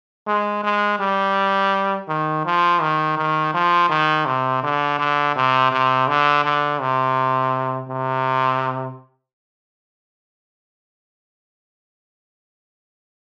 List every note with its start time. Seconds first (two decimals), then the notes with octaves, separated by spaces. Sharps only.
0.27 G#3
0.63 G#3
0.99 G3
2.08 D#3
2.45 F3
2.81 D#3
3.17 D#3
3.54 F3
3.90 D#3
4.26 C3
4.63 D3
4.99 D3
5.36 C3
5.72 C3
6.08 D3
6.45 D3
6.81 C3
7.89 C3